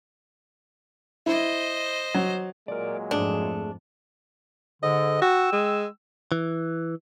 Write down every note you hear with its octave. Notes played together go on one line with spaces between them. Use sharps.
E4 C5 D#5
F#3
A#2 F#3 G#3 A#4 D5
F2 G#2 A3 D4 G#4
G#2 D3 D#5
F#4 G5 E6
G#3
E3